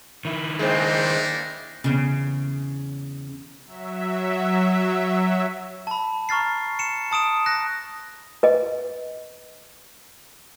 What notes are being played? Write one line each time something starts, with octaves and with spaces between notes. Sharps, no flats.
D#3 E4
G#3 A#3 C4 D4 D#4
E2 C#3
F#3 E5
A5 B5
A#5 C#6 F6 A6 C7
C#7 E7
A5 D#6 D7 E7
F#6 A#6
B4 D#5